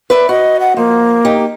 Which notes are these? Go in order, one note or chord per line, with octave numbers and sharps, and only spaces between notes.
B4 D5 E5
F#4 D#5
F#5
F3 A#3
D#4 G4